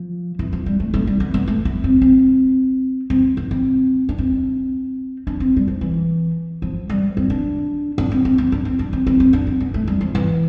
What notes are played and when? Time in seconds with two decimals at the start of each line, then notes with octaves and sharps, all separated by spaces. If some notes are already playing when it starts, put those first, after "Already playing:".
Already playing: F3
0.39 E3
0.53 F3
0.66 G3
0.80 A3
0.94 A3
1.07 G3
1.20 B3
1.34 B3
1.48 A3
1.65 B3
1.84 C4
2.02 C4
3.10 C4
3.37 B3
3.51 C4
4.09 D4
4.18 C4
5.27 D4
5.40 C4
5.57 G3
5.68 F3
5.81 E3
6.62 F3
6.90 G3
7.17 C4
7.30 D4
7.98 D4
8.12 C4
8.25 C4
8.38 C4
8.52 D4
8.65 C4
8.79 D4
8.93 C4
9.07 C4
9.20 C4
9.33 D4
9.47 C4
9.61 B3
9.74 A3
9.88 G3
10.01 F3
10.15 E3